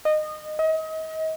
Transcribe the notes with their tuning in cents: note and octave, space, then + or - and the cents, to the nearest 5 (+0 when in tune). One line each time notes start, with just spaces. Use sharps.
D#5 -20
D#5 +35